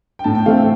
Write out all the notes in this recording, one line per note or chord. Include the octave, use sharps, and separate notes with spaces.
G5
A2 A5
G5
E3 A3 C4 F5